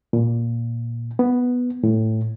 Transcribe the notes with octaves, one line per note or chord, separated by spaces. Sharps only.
A#2
B3
A2